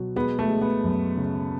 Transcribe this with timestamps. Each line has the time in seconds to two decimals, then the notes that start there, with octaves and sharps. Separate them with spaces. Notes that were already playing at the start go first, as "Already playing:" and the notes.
Already playing: B2 F#3
0.16 G#3 B3
0.39 A3
0.50 G#3
0.61 B3
0.84 F#2
1.17 C#3